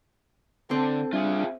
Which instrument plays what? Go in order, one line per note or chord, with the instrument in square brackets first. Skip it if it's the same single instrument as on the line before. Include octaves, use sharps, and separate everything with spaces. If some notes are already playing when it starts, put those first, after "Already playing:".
[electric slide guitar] D3 [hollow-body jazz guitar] C4 [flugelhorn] A4
[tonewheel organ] G3 D4 [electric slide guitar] F4 G#4 [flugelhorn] E5